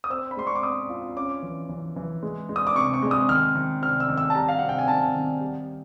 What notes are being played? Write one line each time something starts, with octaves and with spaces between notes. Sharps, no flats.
D#6
C4 E6
B5
G#3 C6
C#6
D6
C4 D#6
F4
C#4 D6
E3
E3
E3
G#3
G#3
D#6
D6
C3 C#6
C#6
G#3
D#6
D#3 F6
D#3
C3 F6
E6
D#3
E6
A5
G3 A#5
F5
C3 F#5
G5
G#5
D#3 A5
D#3
G3